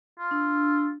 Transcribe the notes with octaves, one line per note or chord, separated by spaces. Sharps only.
F4
D4 E6